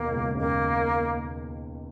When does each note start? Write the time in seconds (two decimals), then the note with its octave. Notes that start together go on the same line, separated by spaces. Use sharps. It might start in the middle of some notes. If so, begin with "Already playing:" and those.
Already playing: D#2 B2 D#3 A#3
0.11 C#2 C#3
0.35 C#3
0.38 D#2 D#3 A#3